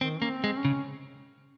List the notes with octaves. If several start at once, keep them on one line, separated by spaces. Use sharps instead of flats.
D#3 C4
A#3 C#4
C4
G#3
C#4
C#3